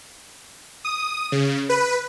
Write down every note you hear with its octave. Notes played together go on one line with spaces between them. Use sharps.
D#6
C#3
B4